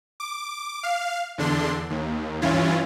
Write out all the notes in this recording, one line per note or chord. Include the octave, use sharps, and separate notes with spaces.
D6
F5
E2 D3 D4 C6
D#2
G2 E3 C#4 E4 F4